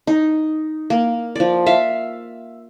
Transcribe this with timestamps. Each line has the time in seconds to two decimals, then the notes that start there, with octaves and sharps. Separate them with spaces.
0.07 D#4
0.90 A#3
1.36 F3 D5
1.66 E5 F5